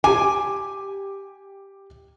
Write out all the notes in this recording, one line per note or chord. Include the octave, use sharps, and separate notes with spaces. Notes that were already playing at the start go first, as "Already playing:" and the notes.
G4 G#5 D6